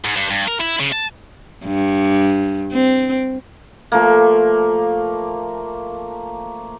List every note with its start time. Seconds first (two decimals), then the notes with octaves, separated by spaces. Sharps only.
0.04 G#2
0.16 G2
0.30 G2
0.48 A#4
0.60 E4
0.80 C#3
0.92 A5
1.65 G2
2.73 C4
3.92 F3 A3 A#3